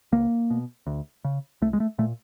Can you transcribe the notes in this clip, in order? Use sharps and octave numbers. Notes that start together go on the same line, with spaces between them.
C#2 A#3
B2
D2
C#3
C2 A3
G#3
A3
A#2 A3